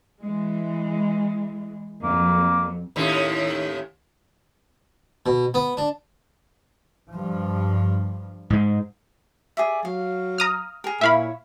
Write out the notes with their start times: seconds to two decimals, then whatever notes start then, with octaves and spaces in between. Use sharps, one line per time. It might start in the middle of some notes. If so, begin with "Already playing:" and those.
0.23 E3 G#3
2.03 F2 F#3 A#3
2.96 D#2 A2 C#4
5.26 B2
5.54 B3
5.77 D4
7.10 G2 F3
8.50 G#2 G#3
9.57 G#4 D5 E5
9.85 F#3 F5
10.38 A#5 D#6 F6
10.84 G#4 A#4
11.01 A#2 E4 C#5 E5 F5 B5